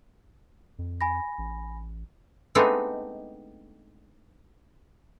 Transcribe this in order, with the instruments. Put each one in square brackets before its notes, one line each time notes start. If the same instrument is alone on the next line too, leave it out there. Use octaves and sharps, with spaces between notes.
[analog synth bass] F2
[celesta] G#5 B5 A#6
[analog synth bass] A1
[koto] G#3 A3 B3 C4 D4 D#4